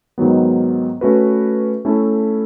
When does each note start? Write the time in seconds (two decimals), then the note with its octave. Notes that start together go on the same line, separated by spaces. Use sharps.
0.18 G#2 D#3 F#3 B3
1.01 A3 C#4 F#4 B4
1.85 A3 C#4 E4 A4